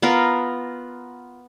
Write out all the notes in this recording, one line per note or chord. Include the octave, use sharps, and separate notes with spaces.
B3 F4 A#4